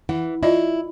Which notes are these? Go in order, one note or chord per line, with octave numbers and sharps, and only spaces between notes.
E3 F#5
E4 F4 D5 D#5